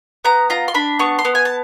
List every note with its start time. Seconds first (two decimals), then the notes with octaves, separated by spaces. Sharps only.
0.25 B3 A#5
0.50 F4 A#5
0.68 C6
0.74 D4 B5
0.99 B3 C#6
1.19 C6
1.25 B3
1.35 G#5
1.45 A5